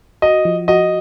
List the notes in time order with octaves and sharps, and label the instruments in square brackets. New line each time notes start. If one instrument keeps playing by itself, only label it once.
[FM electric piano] F#4 [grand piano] D#5
[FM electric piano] F3
[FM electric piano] F#4 [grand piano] D#5